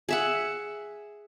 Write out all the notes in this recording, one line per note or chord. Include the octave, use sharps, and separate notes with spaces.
G#4 E5 F#5